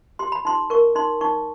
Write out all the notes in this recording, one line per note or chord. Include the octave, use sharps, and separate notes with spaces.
G4 C6
B5
D#4 C6
A#4 C#6
D#4 C6
D#4 C#6